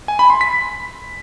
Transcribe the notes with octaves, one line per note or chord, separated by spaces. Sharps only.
G#5
B5
C6
B6